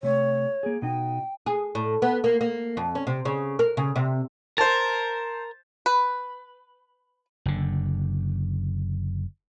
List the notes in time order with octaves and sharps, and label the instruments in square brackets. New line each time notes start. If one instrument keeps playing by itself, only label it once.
[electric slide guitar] C3 A3 [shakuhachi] C#5
[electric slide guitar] A#3 G#4
[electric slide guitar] B2 D#4 [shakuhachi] G5
[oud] G#4
A2
B3
A#3
A#3
F2
C#4
C3
C#3
A#4
C#3
C3
[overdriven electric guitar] A#4 [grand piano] C5 A5 [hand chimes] A6
[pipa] B4
[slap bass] F#1 D3